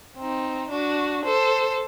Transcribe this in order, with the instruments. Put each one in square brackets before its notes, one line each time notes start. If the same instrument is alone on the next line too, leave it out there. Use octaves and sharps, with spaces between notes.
[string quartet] C4 D#4
D4 F#4
A4 C5